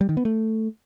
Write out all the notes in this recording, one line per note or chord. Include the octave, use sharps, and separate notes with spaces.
G3
D#3
B3
A3